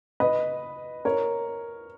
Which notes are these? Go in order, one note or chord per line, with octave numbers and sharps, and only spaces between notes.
B4 D#5
A#4 C#5